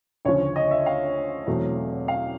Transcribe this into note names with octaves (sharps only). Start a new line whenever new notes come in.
D2 C#3 F3 C#5
D#5
E5
F5
E2 B2 F#3 A3 C4
F5